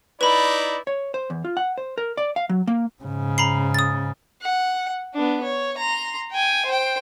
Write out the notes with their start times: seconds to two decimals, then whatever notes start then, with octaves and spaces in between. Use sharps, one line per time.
0.21 D#4 E4 B4 D5 B5
0.87 C#5
1.14 C5
1.30 E2
1.44 F4
1.57 F#5
1.78 C5
1.98 A#4
2.17 D5
2.36 F5
2.49 F#3
2.67 A#3
3.03 G#2 C#3
3.38 A#5 B5 C7
3.74 D#6 A6
4.42 F#5
5.14 B3 D4
5.43 C#5
5.78 A#5 C6
6.31 G5 G#5
6.66 C5 G5